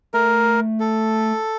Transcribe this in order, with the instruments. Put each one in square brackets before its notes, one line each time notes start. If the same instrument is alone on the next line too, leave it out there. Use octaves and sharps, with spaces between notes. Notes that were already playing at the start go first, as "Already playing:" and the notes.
[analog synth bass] A3 [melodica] A#4
[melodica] A4